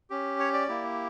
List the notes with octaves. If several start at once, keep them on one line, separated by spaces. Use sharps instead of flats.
C#4 G4
C#5
D5
A#3 E4 G4